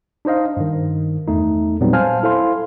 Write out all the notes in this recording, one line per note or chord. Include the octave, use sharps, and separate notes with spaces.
D4 D#4 C5 D#5 F5
G2 D#3
E2 A3 D#4
A#2 F#3 G3 B3 C4 D#4
C5 F5 G#5 A5 F6
E4 A4 C5 F5 C6